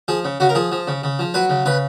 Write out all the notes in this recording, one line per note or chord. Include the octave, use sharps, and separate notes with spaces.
F3 G#4
C#3
C#3 F#4
A#4
F3 G#4
F3
C#3
C#3
F3
F#3 B4
C#3
C#3 B4